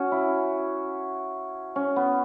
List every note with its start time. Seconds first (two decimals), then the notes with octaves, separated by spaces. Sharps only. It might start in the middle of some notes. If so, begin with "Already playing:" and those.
Already playing: C#4 F#4
0.12 E4
1.76 C#4
1.96 B3